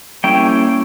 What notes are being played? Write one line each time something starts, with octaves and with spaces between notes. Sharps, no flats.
G3 A#3 C#4 E4 G5